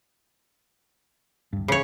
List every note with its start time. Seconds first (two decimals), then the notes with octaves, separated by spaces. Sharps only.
1.53 D1 G2
1.68 C#3 C#5